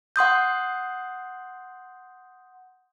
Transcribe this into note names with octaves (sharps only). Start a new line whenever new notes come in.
F#5 C6 D#6 G6